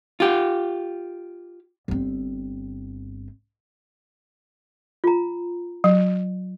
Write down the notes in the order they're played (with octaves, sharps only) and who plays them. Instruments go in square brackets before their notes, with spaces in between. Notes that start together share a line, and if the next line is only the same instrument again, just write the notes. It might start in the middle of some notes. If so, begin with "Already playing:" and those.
[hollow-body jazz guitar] F4 G4
[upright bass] G1 C4
[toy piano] F4 A#5
[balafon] F#3